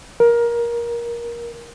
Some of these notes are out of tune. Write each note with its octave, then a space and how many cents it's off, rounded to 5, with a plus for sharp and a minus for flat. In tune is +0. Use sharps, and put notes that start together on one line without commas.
A#4 +20